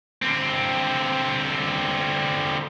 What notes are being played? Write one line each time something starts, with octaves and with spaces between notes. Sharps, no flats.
D3 C4